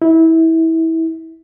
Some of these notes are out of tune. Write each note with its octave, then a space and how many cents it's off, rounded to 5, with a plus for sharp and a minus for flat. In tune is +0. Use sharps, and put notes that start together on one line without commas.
E4 -25